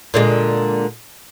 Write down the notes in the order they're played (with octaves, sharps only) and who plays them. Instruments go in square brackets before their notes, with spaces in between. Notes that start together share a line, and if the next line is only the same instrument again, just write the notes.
[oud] A#2 D3 G#3